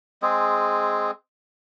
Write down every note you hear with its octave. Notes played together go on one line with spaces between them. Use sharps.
G#3 C4 G#4